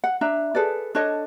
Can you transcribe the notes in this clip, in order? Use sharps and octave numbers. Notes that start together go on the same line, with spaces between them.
F#5
D4 E5 A#5
G#4 A4 B4 D5
D4 A4 C#5 D#5